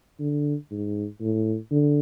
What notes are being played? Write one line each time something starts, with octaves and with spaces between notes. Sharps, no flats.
D3
G#2
A2
D3